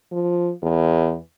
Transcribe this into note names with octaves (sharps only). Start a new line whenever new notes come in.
F3
E2